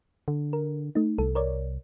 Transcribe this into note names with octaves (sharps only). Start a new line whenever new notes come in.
D3
A#4
A3 D#4
C2 A4
A#4 C#5 D5